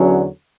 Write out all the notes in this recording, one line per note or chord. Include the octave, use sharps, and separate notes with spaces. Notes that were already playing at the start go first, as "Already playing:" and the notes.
Already playing: E2 D3 F#3 C#4